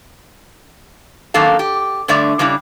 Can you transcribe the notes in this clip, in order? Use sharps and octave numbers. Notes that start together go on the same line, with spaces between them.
F#2 D#3 A#3 D4 A4 F5
G4
G2 D3 A3 D5 E5
C#3 G3 D4 E4